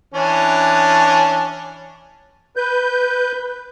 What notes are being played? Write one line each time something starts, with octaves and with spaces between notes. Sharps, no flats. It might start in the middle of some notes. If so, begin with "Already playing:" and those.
E3 C#4 D4
B4 G6